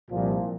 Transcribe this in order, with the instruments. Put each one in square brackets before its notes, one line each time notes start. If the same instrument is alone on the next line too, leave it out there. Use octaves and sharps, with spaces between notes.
[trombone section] C2 A#2 F3